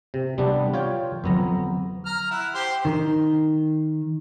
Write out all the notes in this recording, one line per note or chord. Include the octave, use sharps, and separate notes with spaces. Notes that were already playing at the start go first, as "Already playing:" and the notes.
C3
C3 G3 B3 D4
F4 C#5 G5
F2 D3 F#3 B3 C4 A#5
A#5 F6
E4 F#5
G4 C5 C6
D#3